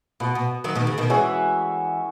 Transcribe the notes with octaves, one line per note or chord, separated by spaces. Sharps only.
B2 B3 F#4 B4
B2
D#3 F#3
B2 D#3
C#3
B2 D#3
E3 G#3 C#4 F#4 C#5 E5